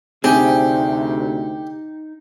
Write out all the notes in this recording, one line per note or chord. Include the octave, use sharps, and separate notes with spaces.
D2 C3 C4 D#4 G4 G#4